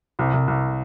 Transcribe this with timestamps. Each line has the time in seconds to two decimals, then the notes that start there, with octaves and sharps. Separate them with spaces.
0.19 C2
0.33 C2
0.48 C2